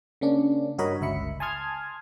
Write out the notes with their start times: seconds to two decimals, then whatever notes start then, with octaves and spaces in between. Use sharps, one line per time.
0.21 C#3 A#3 C#4 D4
0.78 G2 F#4 A#4 C#5 D#5 B5
1.01 G1 C#2 E5 B5 C#7
1.40 G#5 A5 C6 D#6 F6 G#6